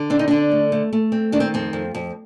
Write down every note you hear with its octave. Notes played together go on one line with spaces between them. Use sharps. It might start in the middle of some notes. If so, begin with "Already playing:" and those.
Already playing: D3
C4 D4
D#4
D3 D4
A3
A3
A3
C4
D#3 D4
C4
F2 C4
F2
F2